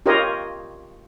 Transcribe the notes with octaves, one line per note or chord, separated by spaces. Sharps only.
F4 G4 A#4 C#5 D#5